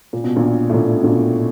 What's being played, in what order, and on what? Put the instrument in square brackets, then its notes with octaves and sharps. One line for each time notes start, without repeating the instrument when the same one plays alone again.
[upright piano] A#2
B2
A#1 A#2
A2
A#1 A#2
B2
A#1 A#2